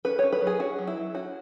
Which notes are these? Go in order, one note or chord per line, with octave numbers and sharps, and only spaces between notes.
C#4 B4
C#4 C#5
B4
F#3
G#4
C#4 F#4
F#3
E4
F#3
C#4 F#4